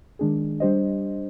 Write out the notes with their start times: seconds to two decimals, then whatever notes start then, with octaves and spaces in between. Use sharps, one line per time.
0.19 D#3 G#3 D4 G#4
0.60 G3 D4 G4 C5 D#5